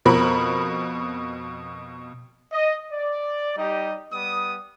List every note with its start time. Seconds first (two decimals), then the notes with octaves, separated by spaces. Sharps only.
0.05 F2 B2 A#4 B5
2.53 D#5
2.91 D5
3.57 G3 D#4 G4 D#5
4.12 G3 B3 D#6